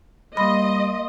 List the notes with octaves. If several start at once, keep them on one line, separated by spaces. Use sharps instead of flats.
G3 A#3 D#5 B5 C6 A#6